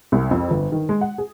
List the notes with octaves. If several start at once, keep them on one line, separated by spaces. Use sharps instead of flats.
C2
F2
G1
D#3
G#3
F#5
G#4